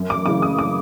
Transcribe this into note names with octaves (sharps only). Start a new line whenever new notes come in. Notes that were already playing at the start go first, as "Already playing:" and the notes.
Already playing: F#2
D6
C#3 E3 D6
D#6
D6